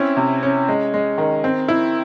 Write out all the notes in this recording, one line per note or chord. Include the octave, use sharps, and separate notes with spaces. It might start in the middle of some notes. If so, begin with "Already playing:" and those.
Already playing: C4 C#4 E4
C3
C#4
G#3
G#3
D#3
C4
E4